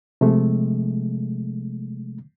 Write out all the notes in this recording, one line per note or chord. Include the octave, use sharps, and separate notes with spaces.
C3 F3 G#3 A3